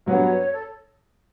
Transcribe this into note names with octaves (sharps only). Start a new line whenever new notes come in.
G2 F#3 B3 C#5
A4